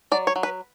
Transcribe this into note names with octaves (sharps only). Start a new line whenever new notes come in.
F#3 D5
C#5
F#3
B4